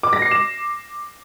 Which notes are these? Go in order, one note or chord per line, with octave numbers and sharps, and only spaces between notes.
D6
A#6
C7
E7